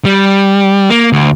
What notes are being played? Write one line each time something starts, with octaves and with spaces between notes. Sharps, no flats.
G3
A#3
D2